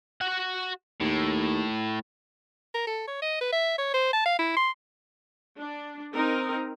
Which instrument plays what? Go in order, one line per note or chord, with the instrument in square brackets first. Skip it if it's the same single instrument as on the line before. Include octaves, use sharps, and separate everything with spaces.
[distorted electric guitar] F#4 F#5
[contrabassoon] D#2 [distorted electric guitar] A2
[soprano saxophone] A#4
A4
C#5
D#5
B4
E5
C#5
C5
A5
F5
E4
C6
[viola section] D4
C4 D#4 A#4